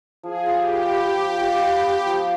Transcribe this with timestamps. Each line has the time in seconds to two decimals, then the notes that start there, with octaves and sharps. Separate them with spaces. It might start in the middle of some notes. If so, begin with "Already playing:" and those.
0.23 F3 G#4
0.46 F4
0.58 G4
0.70 B4
0.91 B3
1.15 F3
1.38 F4
1.59 B4
1.83 B3
2.06 F3